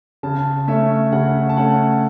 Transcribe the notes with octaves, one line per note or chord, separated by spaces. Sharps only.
C#3 A5
A3 C#4 E5
C#3 F#5
A5
A3 C#4 F#5